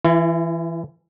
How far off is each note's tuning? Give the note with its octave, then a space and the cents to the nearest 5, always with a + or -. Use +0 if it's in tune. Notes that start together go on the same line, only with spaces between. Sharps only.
E3 +0 E4 +45